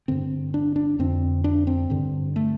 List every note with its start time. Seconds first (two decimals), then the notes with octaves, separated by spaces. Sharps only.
0.08 G2 D3 C4
0.54 D4
0.76 D4
0.99 F2 D3 C4
1.44 D4
1.67 C4
1.90 G2 D3
2.36 A3